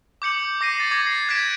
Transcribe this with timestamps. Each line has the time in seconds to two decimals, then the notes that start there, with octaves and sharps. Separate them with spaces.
0.22 D6 G6 C#7 F#7
0.61 D6 A#6 C7 D#7
0.78 A6 C7
0.91 D6 G#6 A#6
1.07 C7
1.29 F#6 G#6 A#6 B6 D7 E7